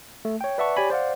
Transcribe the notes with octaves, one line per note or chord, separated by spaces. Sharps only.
A3
C#5 G5
B4 D5 E5 F#5 A5 C#6
G4 C#5 D5 G#5 B5
C5 D5 F5 F#5